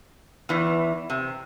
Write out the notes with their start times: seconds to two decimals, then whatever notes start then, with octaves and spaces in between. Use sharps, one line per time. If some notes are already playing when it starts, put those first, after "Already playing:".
0.49 E2 E3
1.10 C3